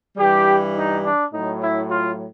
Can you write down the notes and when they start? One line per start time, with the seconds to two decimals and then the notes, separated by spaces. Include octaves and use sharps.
0.17 G2 E3 G3 G4
0.75 D#4
1.03 D4
1.32 A2 F#3 D#4
1.61 E4
1.90 F4